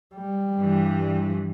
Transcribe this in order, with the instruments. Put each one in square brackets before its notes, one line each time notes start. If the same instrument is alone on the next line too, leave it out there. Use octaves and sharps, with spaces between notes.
[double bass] G3
[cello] G2 E3